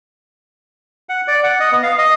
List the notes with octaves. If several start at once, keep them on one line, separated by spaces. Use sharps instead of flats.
F#5
D5
F#5
D#5
B3
F5
D#5